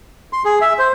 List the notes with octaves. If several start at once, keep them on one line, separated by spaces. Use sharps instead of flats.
C6
G#4
E5
C5